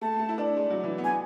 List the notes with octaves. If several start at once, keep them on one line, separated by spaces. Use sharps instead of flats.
A3 A5
A3
E4
D4
G#3
F#3
E3
B3
G#5